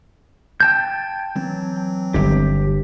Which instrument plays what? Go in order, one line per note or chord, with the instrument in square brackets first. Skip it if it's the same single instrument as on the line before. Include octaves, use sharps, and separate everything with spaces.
[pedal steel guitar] G5 A5 G6 [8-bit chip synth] G#6
[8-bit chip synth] E3 F#3 C4
[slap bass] G1 G2 [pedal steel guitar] G4